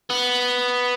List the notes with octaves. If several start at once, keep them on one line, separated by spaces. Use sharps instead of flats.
B3